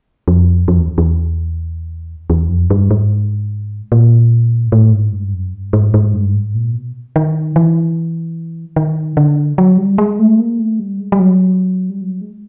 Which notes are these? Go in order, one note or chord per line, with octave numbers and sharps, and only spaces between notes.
F2
F2
E2
E2
E2
F2
G2
G#2
A#2
G#2
A2
G#2
G2
F#2
G2
G#2
G#2
G2
G#2
A#2
B2
D#3
E3
D#3
D3
F#3
G3
G#3
A3
A#3
A3
G3
G#3
G3
F#3
G3
F#3
G#3